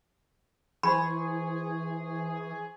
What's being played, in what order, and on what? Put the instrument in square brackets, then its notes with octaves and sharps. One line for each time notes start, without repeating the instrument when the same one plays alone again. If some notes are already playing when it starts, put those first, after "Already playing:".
[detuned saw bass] E3 [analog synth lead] G#4 [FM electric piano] C5 G#5 C#6 [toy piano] B5